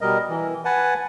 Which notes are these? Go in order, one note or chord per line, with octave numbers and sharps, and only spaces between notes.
B2 G3 A#4 D#5
E3
B4 F#5 G#5 A5